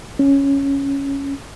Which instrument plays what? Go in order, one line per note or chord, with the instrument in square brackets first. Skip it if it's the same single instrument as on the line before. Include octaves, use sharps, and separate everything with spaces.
[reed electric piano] C#4